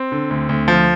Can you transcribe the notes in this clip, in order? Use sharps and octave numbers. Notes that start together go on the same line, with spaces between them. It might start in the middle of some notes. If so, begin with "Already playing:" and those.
Already playing: C4
D3
D2
D2
F3